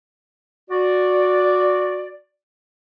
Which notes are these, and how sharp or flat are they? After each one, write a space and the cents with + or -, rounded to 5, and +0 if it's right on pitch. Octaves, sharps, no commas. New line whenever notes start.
F#4 -15 D5 +0